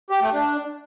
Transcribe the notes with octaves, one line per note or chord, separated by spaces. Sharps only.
G4
A3
D4